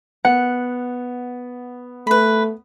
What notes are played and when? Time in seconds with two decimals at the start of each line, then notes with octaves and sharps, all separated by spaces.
0.25 B3 F#5
2.07 A3 B4 B5